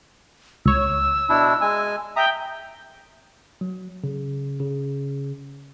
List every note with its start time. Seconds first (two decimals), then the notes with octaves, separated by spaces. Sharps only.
0.66 C#2 C#5 E6
1.29 B2 D4 E4
1.61 G#3 G#5
2.16 E5 G5 A#5 D#6
3.61 F#3
4.04 C#3
4.60 C#3